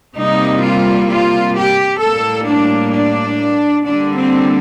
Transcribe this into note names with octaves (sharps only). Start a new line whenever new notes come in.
C3 G3 A#3 D#4
F4
F4
G4
A2 G3 A#3 A4
D4
D4
D3 G3 A#3 D4
C4